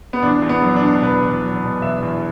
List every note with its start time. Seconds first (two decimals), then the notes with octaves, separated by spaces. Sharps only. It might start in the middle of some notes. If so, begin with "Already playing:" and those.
0.13 B3
0.22 E2 D4
0.42 E2
0.49 B3
0.63 F#3
0.76 D4
0.82 B2
1.03 E2 B4
1.23 E2
1.42 F#3
1.63 B2
1.82 E2 E5
2.02 E2